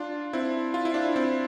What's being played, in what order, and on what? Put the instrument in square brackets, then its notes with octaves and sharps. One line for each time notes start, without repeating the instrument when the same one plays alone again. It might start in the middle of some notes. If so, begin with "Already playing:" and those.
Already playing: [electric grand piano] D4 F4
C4 E4
F4
E4
D4 F4
C4 E4